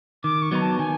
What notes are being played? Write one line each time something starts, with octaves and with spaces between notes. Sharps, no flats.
D#3 D6
C#6
F#3 B3 D#4 A#5
A5
D#3 G#5